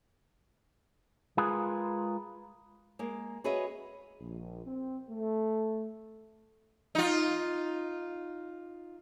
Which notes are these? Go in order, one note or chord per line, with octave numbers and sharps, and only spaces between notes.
G#3 F4 G#4 A#4 B4
G#3 A#3
F#4 G#4 B4 C#5 D#5 E5
A#1
C4
A3
D#4 F4